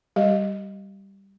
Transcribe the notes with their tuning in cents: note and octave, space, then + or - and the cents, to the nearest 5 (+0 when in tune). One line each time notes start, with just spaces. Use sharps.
G3 +0 G4 -20 D#5 +0